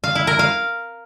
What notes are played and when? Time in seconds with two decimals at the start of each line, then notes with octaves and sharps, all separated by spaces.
0.04 F5
0.15 E4
0.27 A#4
0.39 F5